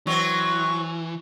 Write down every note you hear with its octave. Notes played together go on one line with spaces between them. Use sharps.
E3 F#3 C4 C#6